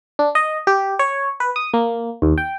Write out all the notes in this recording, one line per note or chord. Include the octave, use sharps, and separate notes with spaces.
D4
D#5
G4
C#5
B4
D#6
A#3
D#2
G5